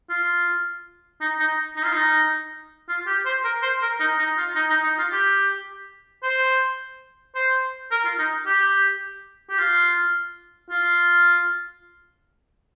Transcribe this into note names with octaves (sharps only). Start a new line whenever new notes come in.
F4
D#4
D#4
D#4
F4
D#4
F4
G4
C5
A#4
C5
A#4
D#4
D#4
F4
D#4
D#4
D#4
F4
G4
C5
C5
A#4
F4
D#4
G4
G4
F4
F4